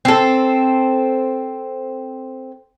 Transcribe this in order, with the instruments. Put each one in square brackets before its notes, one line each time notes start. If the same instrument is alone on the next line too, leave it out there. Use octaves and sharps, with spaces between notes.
[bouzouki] C4 A4